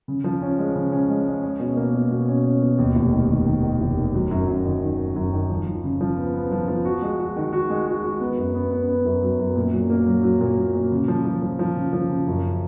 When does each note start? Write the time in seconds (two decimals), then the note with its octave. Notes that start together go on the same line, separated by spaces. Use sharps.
0.08 C#3
0.24 F3
0.42 C#4
0.59 G#3
0.75 C#3
0.92 C#4
1.10 G#3
1.27 G#3
1.43 C#4
1.60 B2
1.77 A#3
1.94 B2
2.11 B2
2.28 C#4
2.45 C#4
2.62 B2
2.78 D#2
2.95 F1
3.13 D#3
3.30 D#3
3.46 D#3
3.63 D#3
3.80 F1
3.97 D#3
4.14 F#3
4.31 F#2
4.48 F#2
4.65 D#3
4.82 D#3
4.98 D#3
5.16 F#2
5.33 D#3
5.50 F3
5.66 F3
5.84 C#3
6.01 F3
6.17 B3
6.34 B3
6.51 F3
6.68 F3
6.85 F#4
7.02 G#3
7.19 F#4
7.36 D#3
7.53 F#4
7.70 G#3
7.87 F#4
8.03 F#4
8.21 B3
8.37 F#2
8.54 B3
8.71 B3
8.89 B3
9.05 F#2
9.23 F#3
9.38 F#2
9.56 A#2
9.73 F#3
9.90 A#3
10.07 F#3
10.23 F#3
10.41 A#2
10.58 A#2
10.75 A#3
10.92 C#3
11.08 F3
11.25 F3
11.42 F3
11.59 F3
11.76 C#3
11.93 F3
12.10 C#3
12.27 F#2